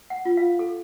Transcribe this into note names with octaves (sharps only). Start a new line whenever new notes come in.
F#5
F4
F5
A4